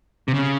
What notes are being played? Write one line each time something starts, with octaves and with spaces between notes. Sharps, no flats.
C3
C#3